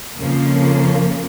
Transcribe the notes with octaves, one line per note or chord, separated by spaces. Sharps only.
F2 C#3 F3 A#3